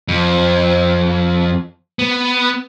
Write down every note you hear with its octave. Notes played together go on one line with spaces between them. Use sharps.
F2
B3